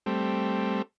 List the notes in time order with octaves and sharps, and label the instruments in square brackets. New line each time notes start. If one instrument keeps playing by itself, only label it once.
[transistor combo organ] G3 A3 C4